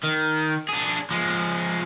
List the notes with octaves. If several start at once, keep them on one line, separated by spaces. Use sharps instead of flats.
D#3
D4 G#4
F3 G#3